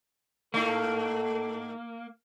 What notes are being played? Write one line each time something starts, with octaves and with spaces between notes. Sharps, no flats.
G#2 A3 A#3 D#4 A4